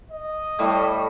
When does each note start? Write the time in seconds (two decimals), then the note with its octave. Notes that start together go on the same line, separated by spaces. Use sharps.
0.12 D#5
0.59 A2 G3 A3